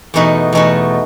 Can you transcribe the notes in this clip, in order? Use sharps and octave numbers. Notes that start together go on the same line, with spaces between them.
E2 B2 A3 D#4 F#4
E2 B2 A3 D#4 F#4